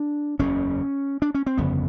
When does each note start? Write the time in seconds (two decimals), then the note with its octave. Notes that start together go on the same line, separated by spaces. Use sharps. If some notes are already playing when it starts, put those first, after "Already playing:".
Already playing: D4
0.39 F#1 E2 C#3 C#4
1.22 D4
1.34 C#4
1.46 C4
1.58 G1 F2 C#3 B3